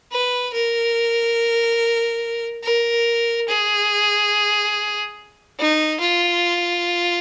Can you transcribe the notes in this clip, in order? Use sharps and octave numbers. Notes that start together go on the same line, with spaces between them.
B4
A#4
A#4
G#4
D#4
F4